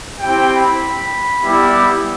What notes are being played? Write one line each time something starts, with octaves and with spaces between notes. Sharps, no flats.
C4 E4 G4 G5
B5
G3 B3 E4 G4